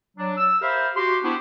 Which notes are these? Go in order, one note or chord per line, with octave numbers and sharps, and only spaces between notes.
F#3 D4
E6
G4 A#4 C5 E5 F5 B5
F#4 G4 C6
B3 D4 E4 F#4 G4 C5